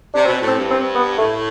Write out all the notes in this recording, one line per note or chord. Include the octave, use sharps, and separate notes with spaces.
C3 D4
B2 C4
A2
C4
G2
C4
B3
A2 A3